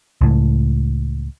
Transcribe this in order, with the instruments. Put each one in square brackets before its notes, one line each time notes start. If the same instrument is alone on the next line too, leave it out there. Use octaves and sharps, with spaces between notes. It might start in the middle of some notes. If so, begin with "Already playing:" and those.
[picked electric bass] C#2 A2